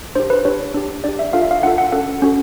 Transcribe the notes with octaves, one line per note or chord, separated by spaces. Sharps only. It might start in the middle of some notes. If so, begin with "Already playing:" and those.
D4 G4 C5
B4
D4 G4 C#5
D4 G4
D4 G4 D5
E5
D4 F4 A4 F5
E5
F5
D4 F4 A4 F#5
F#5
C#4 F#4 A4 F#5
C#4 F#4 A4